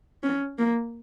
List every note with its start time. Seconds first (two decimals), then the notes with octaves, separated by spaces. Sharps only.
0.23 C#4
0.59 A#3